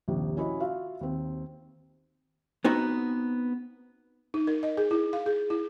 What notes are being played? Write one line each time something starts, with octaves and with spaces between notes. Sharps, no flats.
A#1 D#2 C3
C#4 E4 F#4 D#5
F4 F#4 E5 F5
D#2 C4
B3 C4 D#4 F#4
D#4
A#4
D#5
G#4
E4
F5
G#4
E4